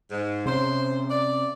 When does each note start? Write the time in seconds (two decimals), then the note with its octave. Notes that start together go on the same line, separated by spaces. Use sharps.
0.11 G#2
0.46 C3 C#4 C5
1.09 D5